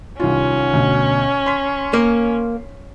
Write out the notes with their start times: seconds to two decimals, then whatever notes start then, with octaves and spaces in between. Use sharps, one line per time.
0.20 C2 D#3 C#4 F4
0.73 D2 B2
1.46 C6 B6
1.93 A#3